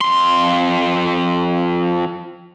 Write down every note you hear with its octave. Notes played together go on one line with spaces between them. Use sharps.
F2 C6